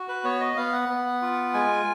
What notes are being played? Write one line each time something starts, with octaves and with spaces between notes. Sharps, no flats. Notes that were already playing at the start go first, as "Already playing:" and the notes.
Already playing: F#4
B4
B3 C#5
D#5
B3 F5
F#5
B3
F4
G#3 G#5